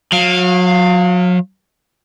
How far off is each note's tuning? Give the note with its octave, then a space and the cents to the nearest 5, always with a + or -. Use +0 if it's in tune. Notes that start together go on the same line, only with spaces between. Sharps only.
F#3 -35 F5 +0